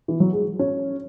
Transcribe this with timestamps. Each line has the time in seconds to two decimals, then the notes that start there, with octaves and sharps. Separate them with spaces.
0.08 E3
0.20 F#3
0.33 G#3
0.59 C#4